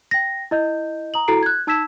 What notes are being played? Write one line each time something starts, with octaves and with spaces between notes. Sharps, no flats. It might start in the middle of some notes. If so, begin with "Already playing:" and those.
G5 A#6
E4 D#5 G6
A#5 D#6 F#7
E4 F#4 A4 A#5 C7 D7
F#6 G#6
D#4 A5 E6 G#6 B6 E7